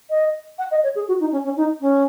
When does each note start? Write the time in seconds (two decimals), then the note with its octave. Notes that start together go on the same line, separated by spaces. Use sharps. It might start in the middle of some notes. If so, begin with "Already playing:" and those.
0.10 D#5
0.58 F#5
0.71 D#5
0.83 C#5
0.95 G#4
1.08 F#4
1.20 D#4
1.32 C#4
1.44 C#4
1.56 D#4
1.81 C#4